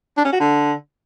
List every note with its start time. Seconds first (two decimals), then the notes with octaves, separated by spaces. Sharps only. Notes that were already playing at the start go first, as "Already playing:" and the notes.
0.17 D4
0.25 C#4
0.32 F#4
0.40 D3